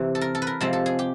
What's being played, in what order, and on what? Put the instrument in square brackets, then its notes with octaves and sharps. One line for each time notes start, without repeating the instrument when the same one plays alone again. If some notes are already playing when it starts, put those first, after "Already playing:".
Already playing: [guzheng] C3 E3
A4
A#4
A4
B4
A#4
C3 F3 G#3 C4 A4
A4
G#4
G4